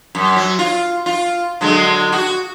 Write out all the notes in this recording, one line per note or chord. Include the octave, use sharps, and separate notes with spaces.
F#2
F#3
F4
F4
D3 F#3 G#3
F#4